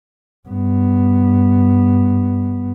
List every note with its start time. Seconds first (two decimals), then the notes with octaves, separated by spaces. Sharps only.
0.49 G2 B3